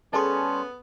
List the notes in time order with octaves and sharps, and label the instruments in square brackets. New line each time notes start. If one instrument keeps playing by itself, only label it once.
[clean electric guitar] G3 C6 [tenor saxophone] B3 [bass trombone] C#4 [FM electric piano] G#4 A4 A5